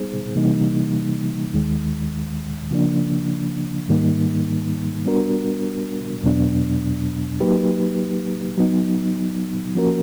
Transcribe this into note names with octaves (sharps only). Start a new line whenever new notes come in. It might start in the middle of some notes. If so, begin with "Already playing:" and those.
Already playing: G3 B3 D#4 G#4 C5
C3 E3 G3 A#3 D#4
D#2 D#3 G#3
C#3 F3 A#3 D4
G#2 D#3 G3 A#3 D#4
G3 B3 D4 F#4 A#4
E2 B2 F#3 B3 D4
F#3 A#3 D#4 G4 B4
F#3 B3 D#4
F3 A#3 C#4 F#4 A#4